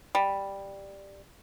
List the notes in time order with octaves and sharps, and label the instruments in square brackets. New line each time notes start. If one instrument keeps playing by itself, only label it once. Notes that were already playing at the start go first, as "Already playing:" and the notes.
[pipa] G3